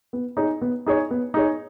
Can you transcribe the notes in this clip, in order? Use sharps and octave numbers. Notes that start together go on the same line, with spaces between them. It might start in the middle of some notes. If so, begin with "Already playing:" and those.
B3
D#4 G#4 C#5
B3
D#4 G#4 C#5
B3
D#4 G#4 C#5